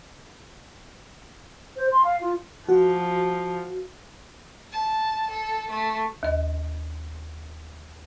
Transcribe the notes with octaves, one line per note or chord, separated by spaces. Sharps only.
C5
C6
F5
F4
F3 F#4
A5
A4
A3
D#2 D#5